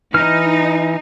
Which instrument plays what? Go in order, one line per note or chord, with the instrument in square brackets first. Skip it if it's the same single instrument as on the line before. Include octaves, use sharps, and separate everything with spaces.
[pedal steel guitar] E3 F6 [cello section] D#4